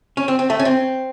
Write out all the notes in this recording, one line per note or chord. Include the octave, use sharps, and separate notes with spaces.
C#4
C4
C4
A3
C#4
C4